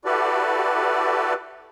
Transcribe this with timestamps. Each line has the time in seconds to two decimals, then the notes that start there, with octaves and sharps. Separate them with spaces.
0.05 E4 F#4 G4 A4 B4 D5